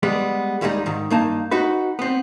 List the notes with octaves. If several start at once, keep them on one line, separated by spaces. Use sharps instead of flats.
G3 G#3 B3
D#2 G3 G#3 B3 D#4
G#2 D#3
G2 A#3 D#4 A5
D#4 F#4 B4
B3 C4